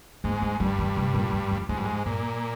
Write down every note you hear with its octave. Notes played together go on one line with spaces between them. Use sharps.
G#2 A#3
G#3
G2 G3
D#3
C3
A#2
G#2
F2
F2 G#2
G2
G#2
G2 A#2